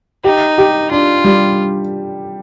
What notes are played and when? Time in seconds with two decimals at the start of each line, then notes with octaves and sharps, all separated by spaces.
0.24 D#4 G4
0.58 G4
0.91 D4 F4
1.24 G3